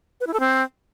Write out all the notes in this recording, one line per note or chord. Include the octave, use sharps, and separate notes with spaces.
B4
E4
A4
C4